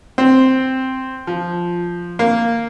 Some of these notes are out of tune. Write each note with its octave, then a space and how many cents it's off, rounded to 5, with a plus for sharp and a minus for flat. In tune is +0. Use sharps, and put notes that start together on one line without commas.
C4 +0
F3 +0
A#3 -5